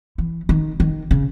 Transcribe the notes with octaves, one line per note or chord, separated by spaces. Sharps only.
E3
D#3
D#3
C#3